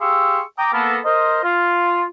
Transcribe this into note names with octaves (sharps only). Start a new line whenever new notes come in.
G4 G#4 F5 C6 C#6 E6
G5 A#5 D6 D#6
A#3 B3 A4 A#4
A#4 C5 D#5
F4